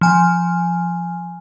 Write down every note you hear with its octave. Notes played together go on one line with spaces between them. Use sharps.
F3 G#5